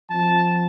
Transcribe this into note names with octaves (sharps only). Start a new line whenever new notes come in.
F3 C4 F4 A5